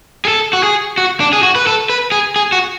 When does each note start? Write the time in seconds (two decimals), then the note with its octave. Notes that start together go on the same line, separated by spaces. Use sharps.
0.25 G#4
0.28 A4
0.53 F#4
0.63 G#4
0.98 F#4
1.20 D4
1.33 G#4
1.43 F#4
1.56 B4
1.67 A4
1.90 B4
2.12 G#4
2.36 G#4
2.52 F#4